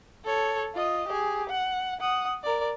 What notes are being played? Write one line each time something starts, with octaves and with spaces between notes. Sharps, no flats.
A4 C#5
F4 D#5
G4 G#4
F#5
F#5 D#6
A#4 D5